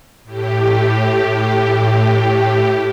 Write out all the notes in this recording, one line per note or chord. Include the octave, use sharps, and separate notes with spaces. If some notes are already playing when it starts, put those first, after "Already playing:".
A2 G4